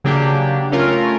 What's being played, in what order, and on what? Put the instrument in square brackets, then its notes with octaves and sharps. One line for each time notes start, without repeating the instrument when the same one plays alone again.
[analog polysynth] C#3 F#3 A#3 D4 G4
A3 C#4 F4 A#4